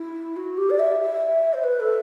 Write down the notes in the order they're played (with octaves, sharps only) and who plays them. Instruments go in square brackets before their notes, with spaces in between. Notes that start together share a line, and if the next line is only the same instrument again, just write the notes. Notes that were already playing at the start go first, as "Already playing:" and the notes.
Already playing: [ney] E4
F#4
G4
D5
E5
E5
C5
B4
A4